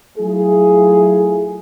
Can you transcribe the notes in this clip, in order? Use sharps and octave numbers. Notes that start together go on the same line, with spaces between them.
F#3 A3 E4 F4 G#4